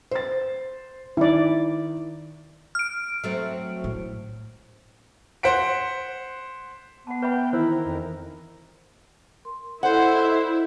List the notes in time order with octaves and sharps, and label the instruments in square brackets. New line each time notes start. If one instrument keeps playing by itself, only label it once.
[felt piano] C5 A6
[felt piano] D#3 [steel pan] E4 D5
[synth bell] F6 D7
[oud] F#3 A3 C4
[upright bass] A2
[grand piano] C5 F#5 B6 D7
[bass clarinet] B3 [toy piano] F#5 A5
[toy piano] B4 E5 B5 [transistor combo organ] G5
[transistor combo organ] D#3 E3 A#4 [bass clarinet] E4 [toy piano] C5
[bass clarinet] F2
[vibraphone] A#4 C6
[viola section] E4 [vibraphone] A4 D5 D#5 [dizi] C5 [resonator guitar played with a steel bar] F#5